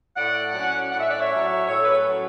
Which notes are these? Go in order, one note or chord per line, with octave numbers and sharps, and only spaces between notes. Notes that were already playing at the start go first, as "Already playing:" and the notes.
A2 D5 F#5
F#3 C#4
A2 F#5
E5
D5
C#5 E5
F#3 C#4
A2 A4 C#5
B4
A4 C#5
F#3 C#4